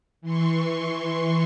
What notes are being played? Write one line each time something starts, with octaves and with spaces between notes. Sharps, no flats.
E3 C6 C#6